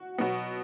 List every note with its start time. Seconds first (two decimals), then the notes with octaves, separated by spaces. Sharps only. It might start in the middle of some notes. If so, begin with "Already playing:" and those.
Already playing: F#4
0.18 B2 F#3 B3